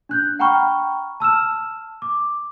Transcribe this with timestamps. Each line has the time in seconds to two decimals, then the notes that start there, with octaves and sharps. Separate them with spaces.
0.09 D4 F#6 G6
0.39 F#5 G5 A#5 B5 C#6 F6
1.20 A5 E6 F6 E7
2.02 D6